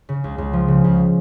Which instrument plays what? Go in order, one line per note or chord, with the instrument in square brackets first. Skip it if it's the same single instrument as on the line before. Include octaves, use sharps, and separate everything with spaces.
[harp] C#3
C#2
C#2
F3
C#3
C#2